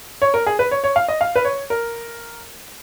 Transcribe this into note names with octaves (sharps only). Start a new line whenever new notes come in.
C#5
A#4
G#4
B4
C#5
C#5
F5
D#5
F5
B4
C#5
A#4